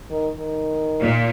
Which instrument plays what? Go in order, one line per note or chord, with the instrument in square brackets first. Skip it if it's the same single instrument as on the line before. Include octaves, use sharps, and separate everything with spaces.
[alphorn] D#3
D#3
[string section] A#2